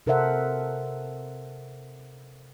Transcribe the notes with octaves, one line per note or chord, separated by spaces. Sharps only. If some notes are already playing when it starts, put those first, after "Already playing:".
C3 A4 A#4 C5 E5 F#5